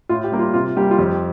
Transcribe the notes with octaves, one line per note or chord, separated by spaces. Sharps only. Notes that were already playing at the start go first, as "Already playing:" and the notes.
A2 F4
G4
G3 A#3
F4
C3 F4
G3 A#3 G4
F4
F2 G4